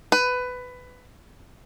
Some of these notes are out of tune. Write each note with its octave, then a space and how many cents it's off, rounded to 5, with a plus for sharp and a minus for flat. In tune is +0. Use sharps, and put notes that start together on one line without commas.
B4 +15